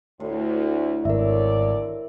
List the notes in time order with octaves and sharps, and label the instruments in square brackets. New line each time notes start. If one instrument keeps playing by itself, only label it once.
[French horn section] D2 [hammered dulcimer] A2
[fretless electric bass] G#1 [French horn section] D2 C#5 D5 [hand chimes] A#4 E5